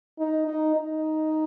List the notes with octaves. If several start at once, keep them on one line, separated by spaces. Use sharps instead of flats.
D#4
D#4
D#4